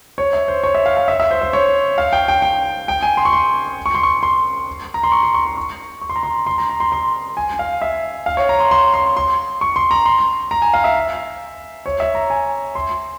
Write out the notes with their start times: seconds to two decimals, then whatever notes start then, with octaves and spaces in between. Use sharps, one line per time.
0.18 C#5
0.33 E5
0.48 C5
0.64 C#5
0.75 E5
0.86 F5
0.97 F5
1.08 E5
1.20 E5
1.31 C5
1.42 C5
1.53 C#5
1.98 F5
2.13 G5
2.28 G5
2.42 G5
2.88 G5
3.03 G#5
3.17 C6
3.25 C#6
3.33 C6
3.86 C#6
3.95 C6
4.03 C#6
4.23 C6
4.94 A#5
5.03 C6
5.12 C#6
5.23 C6
5.34 C#6
5.46 C6
5.57 C#6
6.01 C#6
6.09 C6
6.16 A#5
6.23 C6
6.47 C6
6.58 A#5
6.70 A#5
6.80 C6
6.92 C6
7.37 G#5
7.59 F5
7.82 E5
8.26 F5
8.37 C#5
8.49 A#5
8.60 C6
8.71 C6
8.94 C6
9.17 C6
9.61 C#6
9.76 C6
9.91 A#5
10.06 C6
10.51 A#5
10.62 G#5
10.74 F5
10.84 E5
11.86 C#5
12.00 E5
12.15 A#5
12.30 G#5
12.75 C6